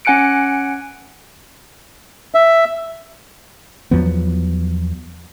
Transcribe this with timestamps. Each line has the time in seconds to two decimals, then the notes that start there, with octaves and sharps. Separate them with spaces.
0.05 C#4 F#5 G#5 F#6 C#7 D7
2.35 E5
3.91 E2 F3 F#3 B3